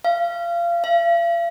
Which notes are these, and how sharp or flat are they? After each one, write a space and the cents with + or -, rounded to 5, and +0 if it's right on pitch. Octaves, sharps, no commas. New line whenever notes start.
F5 -25
F5 -40